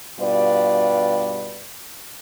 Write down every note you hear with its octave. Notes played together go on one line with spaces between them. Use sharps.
G2 B2 G3 F4 B4 D5